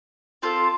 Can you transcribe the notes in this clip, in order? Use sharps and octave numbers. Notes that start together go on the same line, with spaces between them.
C4 F4 A4